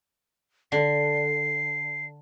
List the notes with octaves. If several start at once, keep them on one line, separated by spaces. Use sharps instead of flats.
D3 C7